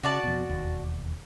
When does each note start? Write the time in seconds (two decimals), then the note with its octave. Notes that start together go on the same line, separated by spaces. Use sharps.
0.03 C#3 F#4 D5 A5
0.24 F2 B2
0.49 E1 D#2